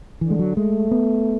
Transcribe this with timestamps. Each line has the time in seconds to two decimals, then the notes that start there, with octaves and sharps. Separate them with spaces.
0.21 D3 E3
0.30 G#3
0.39 F#3
0.57 G#3 A3
0.91 B3